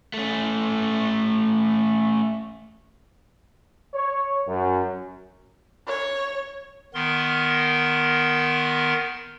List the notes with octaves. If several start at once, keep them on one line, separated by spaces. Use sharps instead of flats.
A3 C#4
C#5
F#2
C#5
D#3 B3 A#4 C6